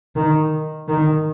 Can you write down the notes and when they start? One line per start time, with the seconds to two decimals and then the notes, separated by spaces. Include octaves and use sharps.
0.16 D#3
0.88 D#3